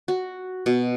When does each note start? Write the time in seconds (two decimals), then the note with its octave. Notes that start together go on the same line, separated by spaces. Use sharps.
0.08 F#4
0.66 B2